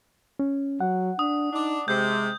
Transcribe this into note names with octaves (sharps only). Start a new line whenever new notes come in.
C#4
F#3 F#5
D4 D#6
D4 D#4
C3 G#3 G6